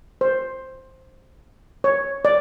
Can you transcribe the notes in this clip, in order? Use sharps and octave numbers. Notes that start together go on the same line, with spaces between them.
C5
C#5
D5